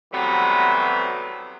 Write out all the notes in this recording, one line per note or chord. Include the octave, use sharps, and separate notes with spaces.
C3 E3 F#3 G3 A3 B3